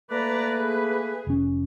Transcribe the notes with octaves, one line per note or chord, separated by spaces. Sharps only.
A3 A#3 B4 D5 A#5
G#4
F1 C#4